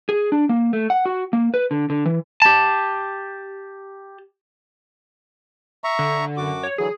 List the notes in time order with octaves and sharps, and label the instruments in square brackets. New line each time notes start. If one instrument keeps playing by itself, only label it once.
[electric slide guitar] G#4
D4
A#3
A3
F#5
F#4
A#3
B4
D3
D3
E3
[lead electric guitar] G4 A5
[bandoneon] E5 A#5 C#6
[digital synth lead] D3
[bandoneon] F#2 F#4 D6
[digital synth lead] C#5
[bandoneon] D3 E3 F#3 [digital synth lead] G#4